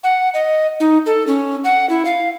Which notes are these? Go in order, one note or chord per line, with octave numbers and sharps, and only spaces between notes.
F#5
D#5
D#4
A4
C#4
F#5
E4
F5